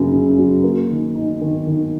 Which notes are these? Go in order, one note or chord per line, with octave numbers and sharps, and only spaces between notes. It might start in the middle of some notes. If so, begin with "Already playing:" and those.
Already playing: F#2 C#3 F#3 A#3
C#3
F#3
A#3
D#3
D#4
D#3
D#3